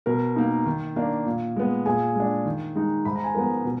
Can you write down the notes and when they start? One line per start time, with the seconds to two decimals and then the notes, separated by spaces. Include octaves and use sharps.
0.06 B2 A#4
0.36 A#3 D#4
0.66 D#3
0.96 A#3 D4
1.26 A#2
1.56 G#3 B3
1.86 A#2 G#4 G#5
2.16 G#3 D4
2.46 D#3
2.76 G#3 D#4
3.05 G#2 B5
3.16 A#5
3.24 G#5
3.34 F3 G#3 B3 A#4 A#5
3.65 B2